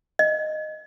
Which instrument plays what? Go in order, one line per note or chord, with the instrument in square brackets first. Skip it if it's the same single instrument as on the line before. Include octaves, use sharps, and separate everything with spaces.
[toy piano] D#5